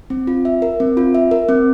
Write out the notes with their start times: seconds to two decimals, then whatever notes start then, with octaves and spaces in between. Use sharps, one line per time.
0.10 C4
0.27 F4
0.45 E5
0.62 A#4
0.80 C4
0.97 F4
1.15 E5
1.31 A#4
1.49 C4